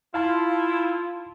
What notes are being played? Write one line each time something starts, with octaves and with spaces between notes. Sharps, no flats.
E4 F4 F5 A5 C6